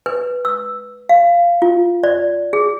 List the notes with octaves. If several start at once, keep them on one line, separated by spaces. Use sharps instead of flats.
B4
E6
F5
F4
D5
G#4